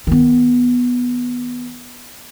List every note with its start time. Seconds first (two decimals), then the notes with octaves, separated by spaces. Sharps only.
0.07 D#3 B3